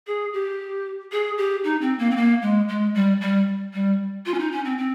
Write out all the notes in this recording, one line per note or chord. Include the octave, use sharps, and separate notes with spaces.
G#4
G4
G#4
G4
D#4
C4
A#3
C4
A#3
G#3
G#3
G3
G3
G3
F4
C#4
D#4
C#4
C4
C4